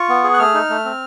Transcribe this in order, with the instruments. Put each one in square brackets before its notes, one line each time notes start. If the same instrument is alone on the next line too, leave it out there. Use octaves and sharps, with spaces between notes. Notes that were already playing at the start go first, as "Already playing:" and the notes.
Already playing: [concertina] F4 C#6
B3
G#4
F#6
A3 F6
D#4
A3
C4